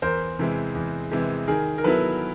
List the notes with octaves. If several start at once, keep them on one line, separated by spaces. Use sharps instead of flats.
E2 A#4 C5
C3 E3 G#3
E2
C3 E3 G#3
D#3 G#4 A#4
A#4
F#3 B3 E4 A4 B4